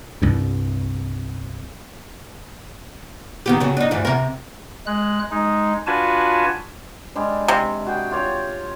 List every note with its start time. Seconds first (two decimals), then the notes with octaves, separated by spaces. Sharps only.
0.22 C2 G2
3.46 D#3 B3 G4
3.60 C#3 F#3
3.77 D4 D#4
3.91 D2 G2 E3
4.05 C3 A#4
4.86 G#3 F#6
5.31 G#3 D#4
5.87 D4 F4 F#4 B4 G#5 A5
7.15 G3 G#3 D4
7.48 C3
7.86 F#4 G#4 G5
8.11 F4 G4 C#5